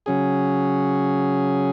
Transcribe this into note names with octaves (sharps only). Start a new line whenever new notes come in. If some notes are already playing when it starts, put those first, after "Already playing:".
C#3 F#3 C#4 G#4